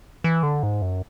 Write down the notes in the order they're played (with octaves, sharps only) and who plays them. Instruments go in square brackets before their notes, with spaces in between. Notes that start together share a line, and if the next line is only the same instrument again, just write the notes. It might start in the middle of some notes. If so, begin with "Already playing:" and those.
[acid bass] E3
D3
G#2
F#2